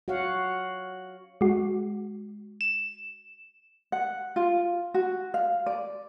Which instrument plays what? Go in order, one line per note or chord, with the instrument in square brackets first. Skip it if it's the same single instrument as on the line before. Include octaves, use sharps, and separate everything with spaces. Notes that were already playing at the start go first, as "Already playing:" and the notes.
[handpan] F#4 C#5 F5 F#5
[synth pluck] G#3 F#4
E7
[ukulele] F#5
F4
F#4
F5
D5